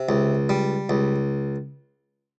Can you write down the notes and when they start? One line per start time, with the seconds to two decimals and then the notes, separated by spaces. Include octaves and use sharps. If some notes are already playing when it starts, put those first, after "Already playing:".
Already playing: C3
0.09 C#2
0.49 G3
0.89 C#2